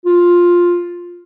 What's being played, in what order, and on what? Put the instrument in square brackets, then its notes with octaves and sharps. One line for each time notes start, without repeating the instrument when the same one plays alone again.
[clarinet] F4